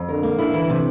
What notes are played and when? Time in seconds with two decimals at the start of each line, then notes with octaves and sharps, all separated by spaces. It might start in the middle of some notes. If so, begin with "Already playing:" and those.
Already playing: F2
0.08 D3 A#4
0.23 A#3
0.38 D3 E4
0.53 E3
0.70 C3